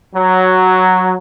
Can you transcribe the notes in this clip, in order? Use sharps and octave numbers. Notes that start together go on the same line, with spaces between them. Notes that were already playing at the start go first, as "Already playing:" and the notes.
F#3